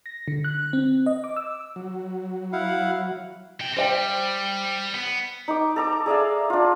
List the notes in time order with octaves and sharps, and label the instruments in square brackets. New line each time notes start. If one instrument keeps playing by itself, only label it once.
[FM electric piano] A#6
D3
F#6
C4
D#5
D6
E6
[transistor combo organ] F#3
[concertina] E4 F5 F#5
[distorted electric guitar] C3 G5
[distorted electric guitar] G3 [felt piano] C5 D5 G5
[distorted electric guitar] B3
[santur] D#4 D6
A4 A#5 D6
G#4 D5 E5 F5
D4 F4